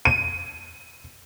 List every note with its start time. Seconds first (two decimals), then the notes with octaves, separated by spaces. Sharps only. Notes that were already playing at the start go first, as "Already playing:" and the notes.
0.05 D#7